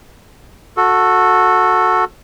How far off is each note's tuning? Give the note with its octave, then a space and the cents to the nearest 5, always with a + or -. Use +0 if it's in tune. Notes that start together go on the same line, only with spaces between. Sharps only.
F#4 -15 A4 +5